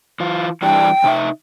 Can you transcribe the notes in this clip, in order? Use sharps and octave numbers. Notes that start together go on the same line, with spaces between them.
E3 F4
E3 G3 D4 G5
C3 D#4 E5